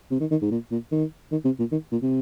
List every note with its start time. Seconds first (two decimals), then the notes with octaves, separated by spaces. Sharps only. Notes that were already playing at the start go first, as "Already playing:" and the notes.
0.11 C3
0.20 D#3
0.31 D#3
0.42 G#2
0.51 A#2
0.71 A#2
0.92 D#3
1.31 D#3
1.45 C3
1.59 A#2
1.72 D#3
1.92 A#2
2.02 C3